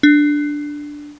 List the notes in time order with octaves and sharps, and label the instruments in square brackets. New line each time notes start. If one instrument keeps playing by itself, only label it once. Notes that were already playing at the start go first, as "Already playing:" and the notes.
[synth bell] D4